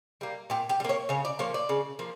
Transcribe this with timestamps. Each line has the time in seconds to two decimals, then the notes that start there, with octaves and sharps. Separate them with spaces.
0.21 G3 A#3
0.50 A#2 G4
0.69 G4
0.80 G3
0.84 A#3 C#5
1.09 C#3 C#5
1.25 D5
1.39 F3 A#3 C#5
1.54 D5
1.69 C#3
1.99 F3 A#3